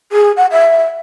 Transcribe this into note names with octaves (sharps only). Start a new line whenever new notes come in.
G#4
F#5
E5